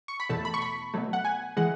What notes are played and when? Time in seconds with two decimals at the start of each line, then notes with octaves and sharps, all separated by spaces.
0.08 C#6
0.20 B5
0.30 E2 B2 A3 A5
0.45 B5
0.54 C#6
0.62 B5
0.94 B2 F#3 A3
1.13 F#5
1.25 G#5
1.57 E3 G#3 F#5